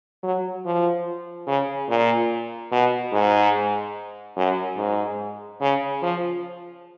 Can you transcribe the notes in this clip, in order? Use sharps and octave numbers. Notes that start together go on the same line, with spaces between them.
F#3
F3
C#3
A#2
B2
G#2
F#2
G#2
C#3
F3